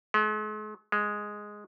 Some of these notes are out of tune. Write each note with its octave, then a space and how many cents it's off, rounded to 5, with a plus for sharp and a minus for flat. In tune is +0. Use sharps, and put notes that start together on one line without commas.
G#3 +45
G#3 +0